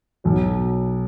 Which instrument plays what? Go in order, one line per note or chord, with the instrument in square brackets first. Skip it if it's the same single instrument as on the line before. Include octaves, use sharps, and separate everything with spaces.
[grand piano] B1 B2 F#3